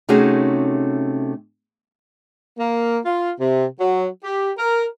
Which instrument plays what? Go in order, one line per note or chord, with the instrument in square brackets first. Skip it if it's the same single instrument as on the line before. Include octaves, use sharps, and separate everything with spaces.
[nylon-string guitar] C3 A3 C#4 D#4 F#4 G#4
[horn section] A#3
F4
C3
F#3
G4
A#4